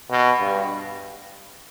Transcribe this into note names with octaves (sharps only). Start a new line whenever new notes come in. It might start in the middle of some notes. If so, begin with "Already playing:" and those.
B2
G2